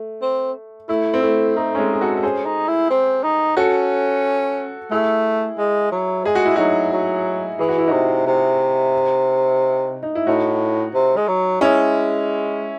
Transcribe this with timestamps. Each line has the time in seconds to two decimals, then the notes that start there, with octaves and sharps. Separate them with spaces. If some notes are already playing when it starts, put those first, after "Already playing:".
Already playing: A3
0.22 C4
0.89 A3 E4
1.14 C4
1.22 A3 E4
1.56 A3 D#4
1.75 C#4
1.78 G#3 C4
1.93 G#4
2.01 F#4 A4
2.17 A4
2.23 C#4 G#4 C5
2.46 D#4
2.68 E4
2.90 C4
3.24 D#4
3.57 C#4 F#4 A4
4.91 A3 E4 G#4
5.58 G#3
5.92 F#3
6.25 G#3 G#4
6.35 F#4
6.46 E4
6.56 F#3 D#4 F#4
6.92 F#3
7.59 E3 G#4
7.69 F#4
7.78 E4
7.88 C3 D#4 F#4
8.27 C3
10.03 D#4
10.15 E4
10.27 A2 D#4 F#4
10.94 C3
11.17 G#3
11.28 F#3
11.61 G#3 C#4 E4